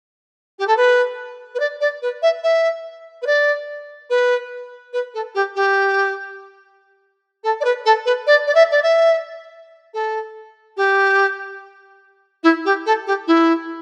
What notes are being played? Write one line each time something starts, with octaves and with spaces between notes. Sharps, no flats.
G4
A4
B4
B4
D5
D5
B4
E5
E5
B4
D5
B4
B4
A4
G4
G4
A4
D5
B4
A4
B4
D5
D5
E5
D5
E5
A4
G4
E4
G4
A4
G4
E4